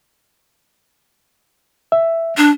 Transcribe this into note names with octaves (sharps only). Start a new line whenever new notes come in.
E5
D4